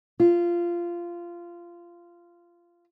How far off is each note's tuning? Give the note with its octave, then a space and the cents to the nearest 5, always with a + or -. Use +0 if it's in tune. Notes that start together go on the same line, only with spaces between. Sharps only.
F4 -15